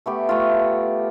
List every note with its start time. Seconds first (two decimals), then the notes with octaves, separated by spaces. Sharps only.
0.06 A3 B3 G4
0.29 A3 F4